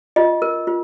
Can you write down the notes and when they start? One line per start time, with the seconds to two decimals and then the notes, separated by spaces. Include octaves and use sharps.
0.16 F4 D#5
0.42 A#4
0.67 F4